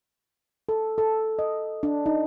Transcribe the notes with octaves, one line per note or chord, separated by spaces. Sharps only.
A4
A4
D#5
D4
D#4